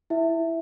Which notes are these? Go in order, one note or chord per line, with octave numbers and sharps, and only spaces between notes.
E4 E5